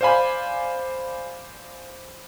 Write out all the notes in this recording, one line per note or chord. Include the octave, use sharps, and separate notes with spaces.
C5 D5 F5 G#5 B5